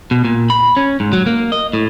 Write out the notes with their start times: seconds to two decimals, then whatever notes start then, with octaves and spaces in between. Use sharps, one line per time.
0.11 B2
0.25 A#2
0.50 B5
0.77 C#4
1.00 G#2
1.13 F#3
1.26 A#3
1.52 D#5
1.73 A2